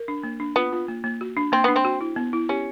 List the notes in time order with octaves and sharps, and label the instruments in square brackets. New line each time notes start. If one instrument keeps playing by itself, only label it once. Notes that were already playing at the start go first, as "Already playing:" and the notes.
Already playing: [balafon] A#4
D4
A#3
D4
[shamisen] B3 [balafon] F4
[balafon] F4
A#3
A#3
F#4
D4
[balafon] A#3 [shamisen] C4
[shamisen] B3 [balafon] D4
[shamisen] C4
[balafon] F#4
E4
B3
E4
[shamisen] C#4 [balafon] G4